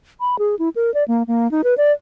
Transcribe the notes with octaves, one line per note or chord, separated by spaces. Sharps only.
B5
G#4
E4
A#4
D5
A#3
A#3
D#4
B4
D5